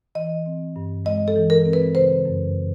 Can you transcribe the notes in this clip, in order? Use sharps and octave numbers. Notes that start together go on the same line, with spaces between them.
E3 D#5
C4
G2
G#3 D#5
A4
E3
A#4
C4
B4
C#3 C5
F#2